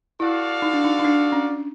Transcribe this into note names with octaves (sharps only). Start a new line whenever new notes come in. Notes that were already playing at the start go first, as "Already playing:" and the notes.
E4 F#4 A4 D5 F5
D#4
D4
D#4
D#4
D4
C#4